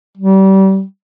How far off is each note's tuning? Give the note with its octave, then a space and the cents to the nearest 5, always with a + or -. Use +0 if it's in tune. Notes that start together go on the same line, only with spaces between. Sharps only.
G3 -30